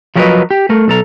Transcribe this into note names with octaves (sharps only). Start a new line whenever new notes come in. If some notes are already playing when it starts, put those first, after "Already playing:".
F3 F#3 G4 A#4 B4 D#5
G4
A3 A#4
B1 A4 A#5